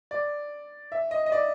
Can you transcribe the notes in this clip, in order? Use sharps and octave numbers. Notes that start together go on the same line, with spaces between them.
D5
E5
D#5
D#5
D5